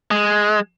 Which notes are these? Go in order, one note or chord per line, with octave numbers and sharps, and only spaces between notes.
G#3